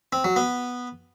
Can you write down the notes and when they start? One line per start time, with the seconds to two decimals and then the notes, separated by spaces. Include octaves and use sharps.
0.13 C4
0.24 F#3
0.36 B3